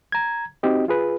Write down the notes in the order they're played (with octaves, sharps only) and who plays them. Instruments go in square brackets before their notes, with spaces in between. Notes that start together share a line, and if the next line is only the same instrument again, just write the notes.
[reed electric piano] A#5 G#6
C4 D#4 F#4 G4 D#5
F4 G#4 B4